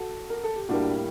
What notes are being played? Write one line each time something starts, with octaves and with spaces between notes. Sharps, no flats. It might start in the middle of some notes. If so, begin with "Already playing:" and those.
Already playing: F#4 A4
A#4
A4
G4
A2 G3 A#3 D4 F#4